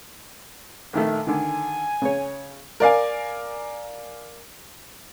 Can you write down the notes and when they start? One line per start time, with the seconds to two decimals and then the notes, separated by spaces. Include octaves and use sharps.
0.93 A#1 D#3 A3 E5
1.27 D3 D#3 G#5
2.02 C#3 C#5
2.80 A#4 D5 F5 G#5